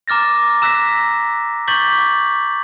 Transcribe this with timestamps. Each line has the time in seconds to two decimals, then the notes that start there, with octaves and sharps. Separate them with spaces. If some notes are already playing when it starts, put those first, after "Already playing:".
0.08 A#5 D6 F6 A6 A#6
0.62 A#5 E6 F#6 A#6 B6
1.68 C#6 D6 G6 A6 B6 F#7